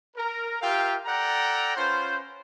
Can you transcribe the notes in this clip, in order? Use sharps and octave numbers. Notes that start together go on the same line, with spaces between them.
A#4
F4 G4 A#4 E5 F5 G5
A4 D5 F#5 G5 A#5
C#4 F4 B4 C5